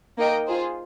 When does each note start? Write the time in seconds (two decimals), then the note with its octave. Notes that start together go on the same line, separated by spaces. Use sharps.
0.17 A#3 D#4 A#4 D#5 G5
0.47 F4 G#4 C5